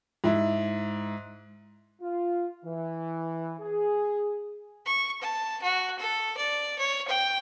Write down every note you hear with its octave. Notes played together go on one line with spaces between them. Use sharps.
G#2 E4
F4
E3
G#4
C#6
A5
F#4
A4
D5
C#5
G5